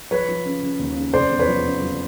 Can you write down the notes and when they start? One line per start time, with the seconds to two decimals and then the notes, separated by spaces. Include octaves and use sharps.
0.11 F3 B4 C#5
0.29 F3
0.45 C#3
0.62 C#3
0.79 D#2
0.97 C#3
1.13 F1 C5 D5
1.30 E2
1.39 B4 C#5
1.47 F3
1.65 C#3
1.82 F3